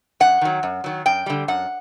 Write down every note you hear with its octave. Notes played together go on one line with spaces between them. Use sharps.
F#2 F#5
D#3 F#3
F#2
D#3 F#3
F#2 G5
D3 G3
F#2 F#5